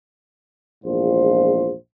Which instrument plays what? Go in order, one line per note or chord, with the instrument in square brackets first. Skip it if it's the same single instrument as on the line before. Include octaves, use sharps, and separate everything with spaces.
[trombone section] A#1 E2 G#2 F4 C5